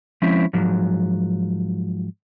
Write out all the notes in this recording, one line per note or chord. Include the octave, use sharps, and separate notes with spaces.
F3 G#3 C4 C#4 E4
G#2 F3 F#3